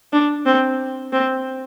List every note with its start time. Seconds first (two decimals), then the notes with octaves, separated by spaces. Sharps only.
0.13 D4
0.46 C4
1.12 C4